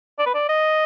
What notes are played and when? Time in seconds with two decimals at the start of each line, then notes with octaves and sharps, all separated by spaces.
0.19 D5
0.26 B4
0.34 D5
0.49 D#5